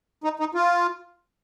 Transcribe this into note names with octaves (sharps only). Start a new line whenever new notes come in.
D#4
D#4
F4